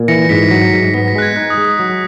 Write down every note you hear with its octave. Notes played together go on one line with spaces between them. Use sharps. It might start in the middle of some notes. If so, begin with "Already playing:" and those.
Already playing: A#2
E3 A#6 C#7
G#2 B6
F#3 A#6
G#2 B6
B3 B6
A#6
G#3 F#6
G#6
D#4 F#6
D#6
G#3
D#6
F#3